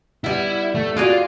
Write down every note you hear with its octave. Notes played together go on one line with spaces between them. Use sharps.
G3 B3 E4
A3
F4 F#4 G#4 D5